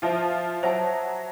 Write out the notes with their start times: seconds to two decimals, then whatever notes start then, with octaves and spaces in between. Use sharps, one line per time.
0.02 F3 F4 C5 E5 A5
0.63 F#3 F#4 C5 E5 A5